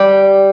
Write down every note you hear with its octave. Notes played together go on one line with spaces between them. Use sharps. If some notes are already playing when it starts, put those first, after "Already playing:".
Already playing: G3 G4